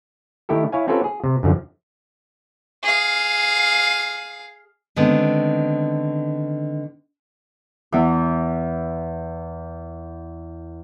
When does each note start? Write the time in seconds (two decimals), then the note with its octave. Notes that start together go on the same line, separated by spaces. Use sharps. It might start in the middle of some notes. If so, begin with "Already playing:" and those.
0.49 D#3 A3 E4 G4 A4
0.72 E4 C#5 F5 G#5
0.87 C4 C#4 F4 G4 A4 B4
1.04 G#4
1.24 C3
1.43 F#2 D3 F3
2.83 G#4 F5
4.96 D3 D#3 G#3 B3 C4
7.92 E2 E3